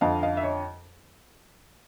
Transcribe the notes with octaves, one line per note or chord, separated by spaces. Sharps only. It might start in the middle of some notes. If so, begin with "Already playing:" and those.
F2 D3 F3 D#5 F5
D#5 F5
E5
C#5 D#5